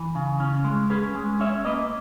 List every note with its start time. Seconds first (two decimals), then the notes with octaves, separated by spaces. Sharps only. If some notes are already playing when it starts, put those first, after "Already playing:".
Already playing: E3
0.15 C#3
0.40 C#4
0.64 G#3
0.90 C#4 G#4 B4
1.15 G#3
1.40 C#4 C#5 E5
1.65 A#3 B4 D#5